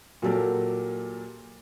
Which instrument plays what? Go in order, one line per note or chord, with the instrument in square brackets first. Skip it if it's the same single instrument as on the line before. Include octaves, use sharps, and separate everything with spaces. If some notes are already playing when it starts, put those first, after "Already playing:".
[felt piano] A#2 F#3 G4 A4 A#4